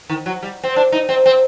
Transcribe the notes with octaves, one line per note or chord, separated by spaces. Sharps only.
D#3
F#3
G3
C4
D4
D#4
C4
C4